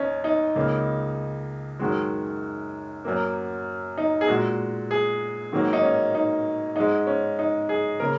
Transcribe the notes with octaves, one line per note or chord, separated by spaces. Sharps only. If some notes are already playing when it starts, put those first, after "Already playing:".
Already playing: D#2 C#4 D#4
D#4
C#2 C#3 A#3
F#2 D#3 G#3 F#4
F#2 F#3 A#3
D#4
G#4
A#2 G#3 F#4
G#4
G#2 D#3 F#3 A#3
D#4
C#4
D#4
G#2 G#3 D#4
C#4
D#4
G#4
C#3 A#3 A#4